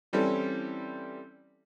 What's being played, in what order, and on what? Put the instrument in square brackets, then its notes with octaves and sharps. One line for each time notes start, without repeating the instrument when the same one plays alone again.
[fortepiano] E3 G3 C4 C#4 E4 A4